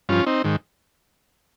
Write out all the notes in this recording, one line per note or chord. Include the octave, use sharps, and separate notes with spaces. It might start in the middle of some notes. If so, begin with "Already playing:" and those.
G2 F3 C#4 F4
C4 D#4
G#2 D#3